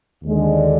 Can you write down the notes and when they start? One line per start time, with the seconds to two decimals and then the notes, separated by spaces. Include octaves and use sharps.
0.24 D#2 D3 G#3